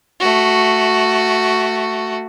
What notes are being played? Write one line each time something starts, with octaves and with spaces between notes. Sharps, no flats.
A3 F#4